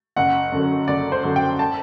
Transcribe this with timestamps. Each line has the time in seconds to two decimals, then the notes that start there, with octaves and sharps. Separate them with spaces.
0.16 F#1 F#5
0.52 F#2 D3 F#3
0.88 F#1 D5
1.12 C5
1.24 F#2 D3 F#3
1.36 G5
1.59 A5